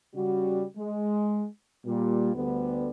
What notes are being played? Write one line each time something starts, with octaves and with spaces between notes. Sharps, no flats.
C#3 G3 F#4
G#3
A#2 G3
D2 D3 G3 B3